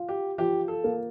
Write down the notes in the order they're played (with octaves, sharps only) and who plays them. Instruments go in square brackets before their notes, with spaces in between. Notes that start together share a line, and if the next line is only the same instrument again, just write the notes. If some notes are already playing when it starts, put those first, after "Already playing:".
Already playing: [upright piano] F4
[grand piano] G4
[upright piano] F3 [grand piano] G4
[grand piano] A4
[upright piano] A#3